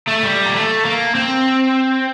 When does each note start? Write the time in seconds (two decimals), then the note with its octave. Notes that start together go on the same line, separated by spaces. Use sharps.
0.08 A3
0.24 G3
0.46 A#3
0.54 A3
0.85 A#3
1.15 C4